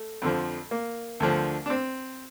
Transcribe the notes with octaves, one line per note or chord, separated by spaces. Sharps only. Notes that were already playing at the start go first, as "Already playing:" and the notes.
Already playing: A3
F2 D3 F3
A#3
D2 D3 F3
D4
C4